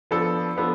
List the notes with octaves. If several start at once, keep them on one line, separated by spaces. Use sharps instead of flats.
F3 B3 D4 A4
F3 B3 D4 A4